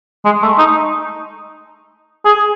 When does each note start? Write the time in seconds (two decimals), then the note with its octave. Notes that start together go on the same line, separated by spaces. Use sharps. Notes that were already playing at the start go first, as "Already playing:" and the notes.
0.25 G#3
0.42 A3
0.58 D#4
2.25 G#4